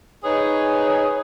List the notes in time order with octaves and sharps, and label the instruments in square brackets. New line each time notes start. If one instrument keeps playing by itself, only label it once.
[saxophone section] D#4 G#4 B4 C#5